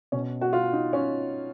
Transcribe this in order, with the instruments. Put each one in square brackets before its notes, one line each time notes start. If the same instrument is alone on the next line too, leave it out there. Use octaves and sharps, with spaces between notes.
[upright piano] B2 C#4
F#4
F4
D#4
C#4